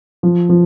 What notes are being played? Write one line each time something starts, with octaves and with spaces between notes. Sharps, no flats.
F3
F3